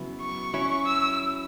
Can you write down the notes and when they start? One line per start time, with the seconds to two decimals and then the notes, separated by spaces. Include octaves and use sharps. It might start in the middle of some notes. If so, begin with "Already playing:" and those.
Already playing: C#3 F#3 B3 E4
0.21 C#6
0.54 F#3 C#4 E4
0.87 E6